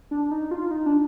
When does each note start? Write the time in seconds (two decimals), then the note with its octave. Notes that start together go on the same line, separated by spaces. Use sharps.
0.11 D4
0.31 D#4
0.51 F4
0.71 D#4
0.86 D4